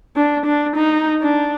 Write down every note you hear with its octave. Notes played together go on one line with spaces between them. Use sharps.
D4
D4
D#4
D4